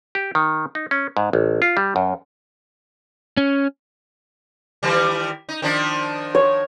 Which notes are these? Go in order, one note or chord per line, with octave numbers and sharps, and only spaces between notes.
G4
D#3
D#4
C#4
G#2
A1
F4
G3
F#2
C#4
D#3 E3 G3
D#4
D#3 F3 D4
C#5